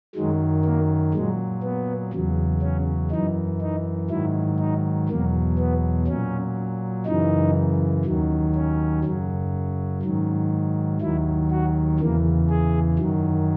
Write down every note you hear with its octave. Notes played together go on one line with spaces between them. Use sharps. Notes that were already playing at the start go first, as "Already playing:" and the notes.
F#2 D#3 F#3 G#3
A#3
A#2 F#3 G#3
B3
E2 C#3 F#3
C#4
F#2 E3 D#4
D#4
G#2 D#3 F#3 E4
D#4
E2 B2 F#3 A#3
B3
A#2 F#3 C#4
F#2 C#3 E3 D#4
D#2 D#3 F#3
C#4
F#2 C#3 F#3
G#2 D#3 F#3
D#2 D#3 F#3 E4
F#4
E2 C#3 E3 A#3
G#4
F#2 D#3 F#3